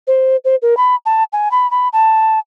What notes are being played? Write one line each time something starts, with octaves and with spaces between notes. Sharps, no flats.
C5
C5
A#4
B5
A5
G#5
B5
B5
A5